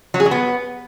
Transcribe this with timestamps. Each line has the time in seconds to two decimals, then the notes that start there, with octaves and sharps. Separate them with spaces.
0.14 F#3
0.20 G#4
0.26 F#3
0.31 B3